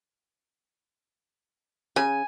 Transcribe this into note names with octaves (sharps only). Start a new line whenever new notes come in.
C#3 G#5